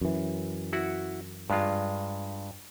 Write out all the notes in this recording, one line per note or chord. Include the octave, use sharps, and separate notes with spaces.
F#2 E3
E4 F#4 F#5
G2 G#3 F4